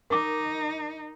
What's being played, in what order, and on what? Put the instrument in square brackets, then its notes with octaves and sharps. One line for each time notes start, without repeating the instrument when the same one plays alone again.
[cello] D#4 [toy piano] A#4 D6